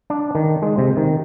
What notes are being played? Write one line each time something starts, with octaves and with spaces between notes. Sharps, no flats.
D4
D#3
G#3
C3
D#3